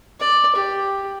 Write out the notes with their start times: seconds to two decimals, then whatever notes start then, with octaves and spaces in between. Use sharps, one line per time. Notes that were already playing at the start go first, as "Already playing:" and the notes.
0.20 D5
0.55 G4